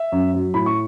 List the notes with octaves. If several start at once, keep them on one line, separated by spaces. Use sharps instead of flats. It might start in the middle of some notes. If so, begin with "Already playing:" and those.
Already playing: E5
F#2
F#3
A2 B5
C#6